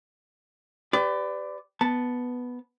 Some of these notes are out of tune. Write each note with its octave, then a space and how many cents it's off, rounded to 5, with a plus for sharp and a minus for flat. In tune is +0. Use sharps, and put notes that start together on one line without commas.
G4 +0 B4 +35 D5 +0
B3 +0 A5 -5